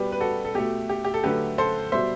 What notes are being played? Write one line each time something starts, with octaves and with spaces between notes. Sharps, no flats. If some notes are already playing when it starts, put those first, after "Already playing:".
Already playing: B2 G3 G4 B4
B4
F#4 A4
A4
B2 A3 G4
G4
G4
A4
D3 F#3 A3 G4 B4
A4 C5
B2 G3 C5 E5